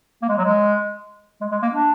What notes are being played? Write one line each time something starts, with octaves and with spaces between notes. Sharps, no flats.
A#3
G#3
F#3
G#3
G#3
G#3
A#3
D4